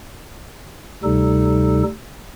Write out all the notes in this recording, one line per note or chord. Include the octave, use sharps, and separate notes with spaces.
D2 C3 G3 D#4 A4